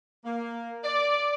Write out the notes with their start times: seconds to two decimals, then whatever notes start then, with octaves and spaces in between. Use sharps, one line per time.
0.25 A#3
0.84 D5